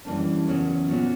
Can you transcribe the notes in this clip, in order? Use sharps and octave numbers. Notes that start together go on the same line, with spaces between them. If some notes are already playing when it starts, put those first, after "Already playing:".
F#2 E3 G3 A#3 D4
E2 C#3 F#3 C#4 F#4
A#2 F#3 B3 F#4